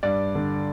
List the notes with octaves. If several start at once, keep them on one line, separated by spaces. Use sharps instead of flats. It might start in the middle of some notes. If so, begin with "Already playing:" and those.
G2 D5
D3